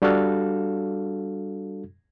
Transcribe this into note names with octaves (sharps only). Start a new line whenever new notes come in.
G3 D4 F#4 A4 F5